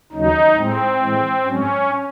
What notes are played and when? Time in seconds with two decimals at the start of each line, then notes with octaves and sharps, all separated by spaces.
0.12 D#2 C#3 F#3 D#4
0.55 A2 G#3 C4
0.99 A2 E3 G#3
1.44 G#2 F#3 C#4